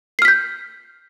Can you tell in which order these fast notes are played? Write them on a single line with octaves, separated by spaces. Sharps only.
C7 F6 B6 G6